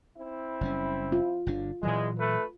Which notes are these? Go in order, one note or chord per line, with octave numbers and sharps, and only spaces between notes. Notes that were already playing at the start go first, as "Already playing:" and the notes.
C4 E4
F#1 G3 C#4
F4
G1 D3 D4
E2 A#2 E3 F#3 G#3
A3 B4